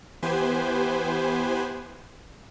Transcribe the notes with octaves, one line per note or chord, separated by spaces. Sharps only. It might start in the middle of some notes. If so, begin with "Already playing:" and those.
E3 B3 G4 B4 C5 G#5